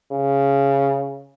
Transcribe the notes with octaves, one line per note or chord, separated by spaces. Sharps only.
C#3